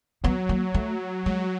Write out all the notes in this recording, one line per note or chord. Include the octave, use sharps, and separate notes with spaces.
F#3 B3
A#3
A3
F#3 G#3